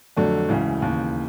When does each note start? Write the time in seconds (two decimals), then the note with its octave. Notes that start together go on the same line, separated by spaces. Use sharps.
0.17 F2 D3 F#3 A3
0.49 D2 C#3 E3 G#3
0.82 D#2 C#3 E3